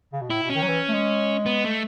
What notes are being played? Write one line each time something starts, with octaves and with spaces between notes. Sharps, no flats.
C#3
B2
A2 E4
B2
C#4
D#3
F#3
E3
A3
G#3
B3
A3